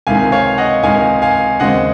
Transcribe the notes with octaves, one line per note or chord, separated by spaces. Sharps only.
C#2 C3 D#3 F5 G#5
C#5 F5
D#5 F#5
C#2 C3 D#3 F5 G#5
F5 G#5
D#2 C#3 G#3 C4 D#5 F#5